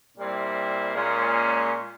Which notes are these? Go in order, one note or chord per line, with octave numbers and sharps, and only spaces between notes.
A#2 G3 C4 E4
A#2 G#3 C#4